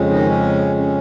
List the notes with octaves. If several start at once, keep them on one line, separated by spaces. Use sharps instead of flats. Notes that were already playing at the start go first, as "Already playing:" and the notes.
Already playing: F2 C#3 G#3
D#3 D#4
C#4
C#4